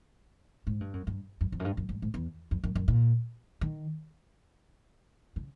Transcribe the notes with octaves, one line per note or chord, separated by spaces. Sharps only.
G#2
G2
F#2
G2
F#2
F2
F#2
G2
F#2
G2
G#2
E2
F2
F#2
F#2
A#2
D#3
C#3